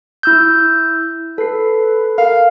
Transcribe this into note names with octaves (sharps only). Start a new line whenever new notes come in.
E4 E6 G6
A4 B4 C7
A#4 F5